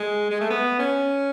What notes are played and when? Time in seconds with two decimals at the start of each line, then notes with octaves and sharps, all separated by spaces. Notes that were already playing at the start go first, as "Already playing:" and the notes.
Already playing: G#3
0.30 G#3
0.41 A3
0.50 B3
0.79 C#4